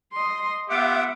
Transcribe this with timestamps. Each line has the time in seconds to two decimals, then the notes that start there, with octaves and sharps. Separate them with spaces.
0.12 D#5 C6
0.70 B3 F4 G4 E5 F#5 D6